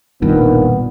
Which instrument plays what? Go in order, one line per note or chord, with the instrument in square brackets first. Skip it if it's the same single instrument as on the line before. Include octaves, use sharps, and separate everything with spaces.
[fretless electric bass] E1 B1 G2 [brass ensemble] A#2 B3 [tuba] D#3